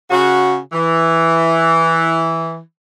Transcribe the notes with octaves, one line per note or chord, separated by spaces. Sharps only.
C#3 F#4
E3